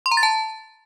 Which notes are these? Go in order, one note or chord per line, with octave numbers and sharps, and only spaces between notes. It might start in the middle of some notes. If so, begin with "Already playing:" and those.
C6
A#5
A6
A5